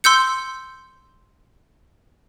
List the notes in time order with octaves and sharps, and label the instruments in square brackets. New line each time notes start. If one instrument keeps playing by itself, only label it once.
[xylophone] C6 E6 G6 C#7